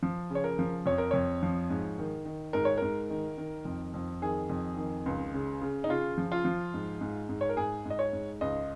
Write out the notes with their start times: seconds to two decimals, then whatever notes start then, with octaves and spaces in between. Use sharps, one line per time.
0.03 F3
0.30 C#3
0.35 C#5
0.44 A#4
0.59 F3
0.86 F2 C#5
0.98 A#4
1.11 F2 C#5
1.43 F3
1.70 G#2
1.98 D#3
2.25 D#3
2.53 G#2 A#4
2.65 C#5
2.78 G#2 A#4
3.10 D#3
3.38 D#3
3.65 F2
3.94 F2
4.22 D#3 G#4
4.50 F2
4.77 D#3
5.06 C#2
5.34 C#3
5.61 C#3
5.84 D#4
5.89 C#3 F4
6.18 F3
6.32 F4
6.45 F3
6.74 G#2
7.01 G#2
7.29 G#2
7.41 C#5
7.49 A#4
7.57 G#2 G#4
7.85 G#2 D#5
7.99 C#5
8.13 G#2
8.41 C#2 D#5